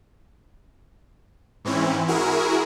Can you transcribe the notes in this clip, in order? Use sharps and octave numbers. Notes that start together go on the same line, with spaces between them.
G#2 E3 C4 C#4 E4
E4 F#4 G#4 A#4